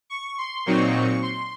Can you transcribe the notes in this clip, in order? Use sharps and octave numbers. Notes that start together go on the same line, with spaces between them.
C#6
C6
A#2 F#3 C4 D#4 C#6
C6